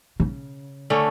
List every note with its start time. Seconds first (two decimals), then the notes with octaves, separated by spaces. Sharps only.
0.20 C#3
0.90 D3 A3 C#4